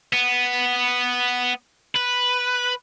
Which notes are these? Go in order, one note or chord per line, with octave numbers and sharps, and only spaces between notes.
B3
B4